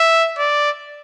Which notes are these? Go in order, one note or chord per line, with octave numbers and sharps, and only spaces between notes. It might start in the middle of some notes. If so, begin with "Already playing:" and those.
Already playing: E5
D5